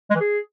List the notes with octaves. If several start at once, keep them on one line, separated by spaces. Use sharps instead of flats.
G#3
E3
G#4